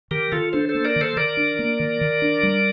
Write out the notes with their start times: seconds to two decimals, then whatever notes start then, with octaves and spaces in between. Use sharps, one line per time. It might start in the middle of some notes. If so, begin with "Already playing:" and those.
0.11 D#3 G4 A#4
0.32 D#3 F4 A4
0.53 D4 A4 C5
0.69 A4 C5
0.75 A#3
0.85 A#4 D5
0.96 D#3
1.01 A4 C5
1.17 D#3 A#4 D5
1.37 D4
1.59 A#3
1.80 D#3
2.01 D#3
2.22 D4
2.43 G3